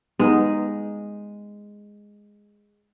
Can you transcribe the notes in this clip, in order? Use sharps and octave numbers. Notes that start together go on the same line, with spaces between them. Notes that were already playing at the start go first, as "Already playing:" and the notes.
G#3 B3 D#4